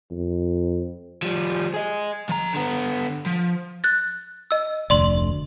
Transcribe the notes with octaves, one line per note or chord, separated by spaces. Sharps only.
F2
F3 G3
G#4 D#5
F3 A#5
D3 B3
F3
F#6 A6
D#5 E6
F1 D2 D5 C6 F#7